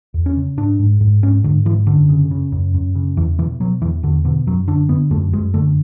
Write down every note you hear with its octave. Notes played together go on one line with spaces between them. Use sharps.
E2
C#4
C#3
G#2 D4
G#2
G#2
G#2 C#4
G#2 D3
G#2 E3
F#2 D3
C#3
C#3
F#2
F#2
C#3
E2 E3
B2 E3
B2 F#3
E2 E3
E2 D3
B2 D3
F#2 F#3
D3 D4
D3 B3
F#2 A3
F#2 G#3
D3 A3